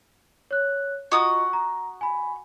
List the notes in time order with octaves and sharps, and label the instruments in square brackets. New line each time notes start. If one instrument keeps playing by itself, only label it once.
[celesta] C#5 F#6
[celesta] F4 D#5 A#5 [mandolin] F#4 D#6
[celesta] A#5
G#5 B5